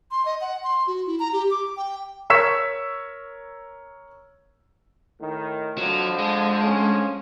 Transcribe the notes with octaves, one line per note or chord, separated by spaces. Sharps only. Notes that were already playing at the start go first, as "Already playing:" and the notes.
C6
D#5
F#5
C6
F#4
E4
A#5
G4
D6
G5
A#4 C#5 C#6 E6 B6 E7
A2 D#3
F2 D3 F3 F#3
G#3
D3 F3 C#4